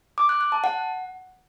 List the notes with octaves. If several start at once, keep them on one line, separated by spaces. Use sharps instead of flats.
D6
F#6
F#6
A5
F#5